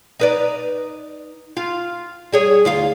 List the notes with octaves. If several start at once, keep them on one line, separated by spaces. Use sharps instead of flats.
D#4 B4 D5
F4
G3 G#4 C#5
D2 F4 F5